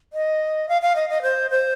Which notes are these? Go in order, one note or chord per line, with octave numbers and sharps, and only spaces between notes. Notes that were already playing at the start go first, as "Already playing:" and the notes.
D#5
F5
F5
D#5
D#5
C5
C5